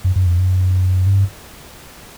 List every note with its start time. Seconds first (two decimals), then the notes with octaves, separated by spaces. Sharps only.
0.04 F#2
0.16 F#2
0.26 F2
0.38 F#2
1.06 G2